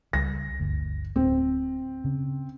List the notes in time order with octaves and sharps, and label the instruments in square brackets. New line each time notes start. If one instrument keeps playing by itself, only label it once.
[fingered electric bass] C#2 G3 [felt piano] A#6
[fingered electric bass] G1 D2
[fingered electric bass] D1 [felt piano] C4
[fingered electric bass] C#3